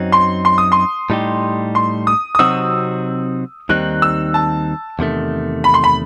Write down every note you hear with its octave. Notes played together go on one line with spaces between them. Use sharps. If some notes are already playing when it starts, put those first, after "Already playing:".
Already playing: F#2 F#3 C4 D#4
C6
C6
D#6
C6
A2 G3 D#4 G4
C6
D#6
D#6
C3 F#3 C4 D#4 F#4 E6
D#2 D#3 G3 C4 D#4 F#6
E6
A5
E2 C3 D#3 A3
B5
C6
B5